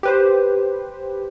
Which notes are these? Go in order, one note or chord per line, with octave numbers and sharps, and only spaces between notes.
G4 B4 C5